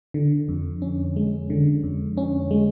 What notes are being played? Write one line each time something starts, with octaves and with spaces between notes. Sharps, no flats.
D3
F2
C#4
G#3
D3
F2
C#4
G#3